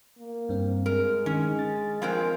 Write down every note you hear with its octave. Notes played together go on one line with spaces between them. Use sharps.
A#3
G2 C4
G#3 A#4
D#3 C#4
A6
F3 G#3 C4 A#4 F5 G#5